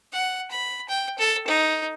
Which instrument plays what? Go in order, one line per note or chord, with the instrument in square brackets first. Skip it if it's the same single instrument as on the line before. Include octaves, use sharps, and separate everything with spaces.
[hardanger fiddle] F#5
B5
G5
A4
D#4